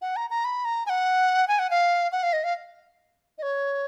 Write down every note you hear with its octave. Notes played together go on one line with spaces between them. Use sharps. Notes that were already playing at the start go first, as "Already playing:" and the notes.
F#5
A#5
A#5
B5
A#5
G#5
F#5
G#5
F#5
F5
F#5
F5
D#5
F5
D#5
C#5